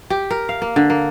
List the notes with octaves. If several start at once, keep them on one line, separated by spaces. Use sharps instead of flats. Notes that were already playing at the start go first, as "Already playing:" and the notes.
G4
A#4
F5
A#3
D3
A#3